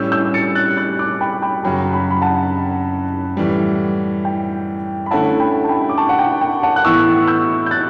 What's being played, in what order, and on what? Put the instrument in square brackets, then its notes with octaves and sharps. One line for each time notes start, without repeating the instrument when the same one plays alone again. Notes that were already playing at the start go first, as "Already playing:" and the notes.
Already playing: [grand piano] A2 G3 C#4 [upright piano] E6 G6
[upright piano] E6 G6
A6 C#7
F#6 A6
F#6 A6
D6 F#6
G5 B5
G5 B5
[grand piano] F#2 C#3 F#3 [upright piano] G5 B5
[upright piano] G5 B5
B5
F#5 A5
[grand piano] A2 E3 G3
[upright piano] G5
B5
[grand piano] D3 A3 C#4 E4 [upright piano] F#5 A5
[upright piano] G5 B5
A5
G5 B5
D6
A5 C#6
F#5
G5
G5
F#5 A5
F#6
[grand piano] A2 E3 B3 E4 [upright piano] C#6 E6
[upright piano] E6 G6
G6
F#6 A6